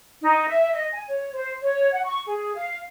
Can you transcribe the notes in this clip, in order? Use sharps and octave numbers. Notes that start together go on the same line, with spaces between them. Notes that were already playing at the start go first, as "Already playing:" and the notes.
D#4
E5
D#5
G#5
C#5
C5
C#5
F#5
C#6
G#4
F5